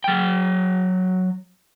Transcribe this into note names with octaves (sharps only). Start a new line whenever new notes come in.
F#3 G5